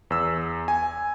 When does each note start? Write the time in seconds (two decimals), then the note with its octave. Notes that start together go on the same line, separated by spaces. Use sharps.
0.10 E2 E6
0.68 G#5